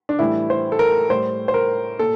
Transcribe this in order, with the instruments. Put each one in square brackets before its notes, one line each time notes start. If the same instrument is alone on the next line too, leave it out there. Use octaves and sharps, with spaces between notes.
[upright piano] D4
A2 E3 G3 E4
C5
A4
A#4
A2 G3 C5
C5
A#4
A#2 A4